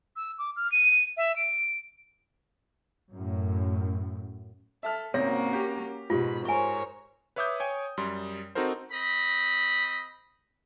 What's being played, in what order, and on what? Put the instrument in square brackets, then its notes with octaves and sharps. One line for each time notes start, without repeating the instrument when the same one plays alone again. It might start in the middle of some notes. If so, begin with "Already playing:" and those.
[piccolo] E6
D6
F6
D#7
E5
D7
[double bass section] F#2 A2
[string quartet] A4 [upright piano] E5 A5 F6
[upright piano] G#1 C3 A#6 [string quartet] A#3 C#4 F#4 [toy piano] C#5
[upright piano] G4
[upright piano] G#2 [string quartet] B2 B5 [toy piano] F4 G4
[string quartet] A#4 C5 C#5 [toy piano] G#5 C#6
[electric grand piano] B4 C#5 E5 D6 D#6 G6
C#5 G5 G#5
F#2 G3 C6
C4 D#4 F#4 A4 A#4 C5
[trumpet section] C4 D#5 B5